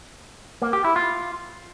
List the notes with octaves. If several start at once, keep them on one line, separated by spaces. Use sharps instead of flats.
A#3
G4
E4
F4